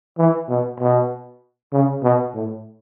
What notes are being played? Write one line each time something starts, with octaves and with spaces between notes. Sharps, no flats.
E3
B2
B2
C#3
B2
A2